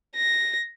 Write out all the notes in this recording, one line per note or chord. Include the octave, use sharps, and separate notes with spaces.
A#6